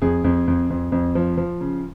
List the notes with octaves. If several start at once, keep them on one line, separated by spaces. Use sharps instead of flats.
F2 G#4
F2
F2
F2
F2
F3
F3
C#3